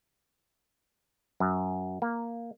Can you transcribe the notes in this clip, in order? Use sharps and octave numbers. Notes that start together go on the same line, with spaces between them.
F#2
A#3